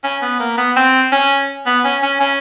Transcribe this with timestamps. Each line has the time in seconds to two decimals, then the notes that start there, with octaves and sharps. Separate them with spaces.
0.04 C#4
0.22 B3
0.40 A#3
0.58 B3
0.76 C4
1.12 C#4
1.66 B3
1.84 C#4
2.03 C#4
2.20 C#4